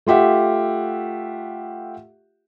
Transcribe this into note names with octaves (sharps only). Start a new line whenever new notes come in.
A3 F4 G4 E5 F#5